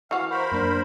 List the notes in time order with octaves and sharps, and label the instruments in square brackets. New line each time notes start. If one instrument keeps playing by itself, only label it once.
[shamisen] E3 F#4 [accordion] F5 [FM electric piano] C#6 F6
[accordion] A#4 C5 B5
[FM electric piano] F#2 A#3 D4